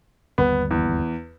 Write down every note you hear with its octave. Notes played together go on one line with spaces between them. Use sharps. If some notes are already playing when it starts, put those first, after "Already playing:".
G1 D#2 G3 B3
E2